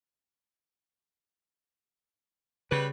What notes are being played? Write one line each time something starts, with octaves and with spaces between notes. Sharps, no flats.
C#3 G3 B4